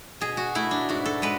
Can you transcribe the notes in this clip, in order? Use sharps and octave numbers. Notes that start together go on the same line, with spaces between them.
B2 G#4
F#4
A3 E4
D4
G#2 F#4
A4
G#3 B4